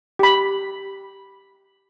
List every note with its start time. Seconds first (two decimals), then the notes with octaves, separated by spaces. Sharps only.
0.19 G4 B5